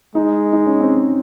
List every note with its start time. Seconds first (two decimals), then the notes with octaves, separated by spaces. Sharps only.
0.15 G#3 D#4
0.53 D#4
0.66 C#4
0.80 C4